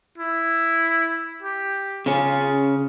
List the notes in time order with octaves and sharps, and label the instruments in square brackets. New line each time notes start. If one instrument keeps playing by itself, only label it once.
[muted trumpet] E4
G4
[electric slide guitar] C#3 C#4 [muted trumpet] F4